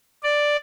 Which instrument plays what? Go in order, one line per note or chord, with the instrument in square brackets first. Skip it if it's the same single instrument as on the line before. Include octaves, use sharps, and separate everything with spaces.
[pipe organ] D5